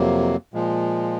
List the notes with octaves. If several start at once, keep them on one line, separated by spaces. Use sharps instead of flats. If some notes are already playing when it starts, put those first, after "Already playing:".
Already playing: F2 C3 F#3 A#3
A#2 F3 G#3